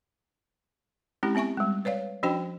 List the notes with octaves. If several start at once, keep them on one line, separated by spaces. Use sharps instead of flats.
G#3 C4 C#4 E4 G4
B3 C4 E5 G#5 C#6
G3 G#3
B4 C#5 D5 F5
F3 C#4 D4 F#4 C5 G5